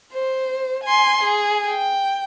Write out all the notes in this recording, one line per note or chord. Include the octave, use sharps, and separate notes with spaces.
C5
G#5 C6
G#4
G5